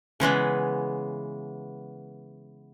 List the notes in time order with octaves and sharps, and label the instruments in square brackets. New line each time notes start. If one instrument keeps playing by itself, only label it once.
[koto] C#3 E3 G#3 B3